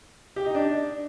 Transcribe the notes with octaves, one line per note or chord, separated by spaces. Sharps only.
G4
D#4
D4